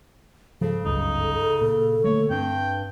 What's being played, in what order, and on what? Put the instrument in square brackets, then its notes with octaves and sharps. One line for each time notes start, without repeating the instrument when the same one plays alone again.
[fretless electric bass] G#2 F3 [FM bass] C#3 [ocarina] A4
[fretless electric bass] G1 C#2 F#2 [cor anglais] D#4
[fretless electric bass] A#2
[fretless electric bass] D3 A3 A#3 [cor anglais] C#5
[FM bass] G2 [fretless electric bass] C4 [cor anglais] G5